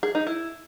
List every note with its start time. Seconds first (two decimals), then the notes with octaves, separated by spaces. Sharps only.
0.03 G#4
0.15 D#4
0.27 E4